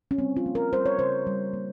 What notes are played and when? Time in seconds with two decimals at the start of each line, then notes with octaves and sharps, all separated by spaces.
0.11 C#4
0.18 G3 C4
0.37 F4
0.46 A#3
0.55 A#4
0.73 G3 C5
0.86 C#5
0.99 C#3 C5
1.27 G3
1.53 A#3